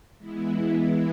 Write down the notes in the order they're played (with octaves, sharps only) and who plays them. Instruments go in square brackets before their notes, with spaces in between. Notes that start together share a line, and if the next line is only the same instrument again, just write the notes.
[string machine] E3 G#3 B3 E4